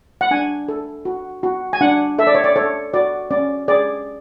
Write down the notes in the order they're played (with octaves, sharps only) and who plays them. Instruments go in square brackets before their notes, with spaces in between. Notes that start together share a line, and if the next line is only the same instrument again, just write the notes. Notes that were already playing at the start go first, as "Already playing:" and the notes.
[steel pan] F#5
D4 G#5
A4
F#4
F#4
G#5
D4 F#5
A4 E5
D5
C#5
D5
A4 C#5
F#4 D5
C#4 D5
G#4 D5